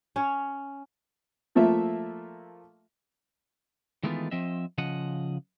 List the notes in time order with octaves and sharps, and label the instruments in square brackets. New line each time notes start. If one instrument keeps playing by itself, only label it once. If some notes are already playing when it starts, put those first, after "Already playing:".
[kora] C#4 C#5
[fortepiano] F3 A3 A#3 F4 E5
[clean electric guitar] D#3 E3 G#3 A3 B3 F4
F3 C4 D#5 E5
C#3 F3 D#5 F#5